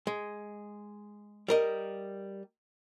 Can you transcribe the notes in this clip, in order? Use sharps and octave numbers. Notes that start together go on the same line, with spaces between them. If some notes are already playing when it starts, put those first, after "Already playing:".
G#3
G3 A#4 D#5